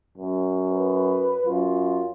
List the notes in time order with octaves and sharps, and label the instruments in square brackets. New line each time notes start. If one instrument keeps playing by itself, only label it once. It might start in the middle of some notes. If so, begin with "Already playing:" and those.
[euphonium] F#2
[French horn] B4
[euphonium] F#2 [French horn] F4